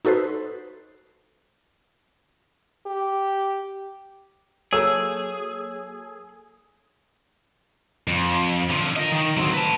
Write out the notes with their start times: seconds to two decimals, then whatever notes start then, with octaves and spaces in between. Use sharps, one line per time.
0.05 D#4 F#4 A4 B4 C5
2.86 G4
4.73 F#3 A#3 G#4 A4 C#5 E6
8.08 F2
8.70 D3 F3
8.96 A#4 D#5
9.12 D#3
9.37 F#3 C4
9.54 B4 A5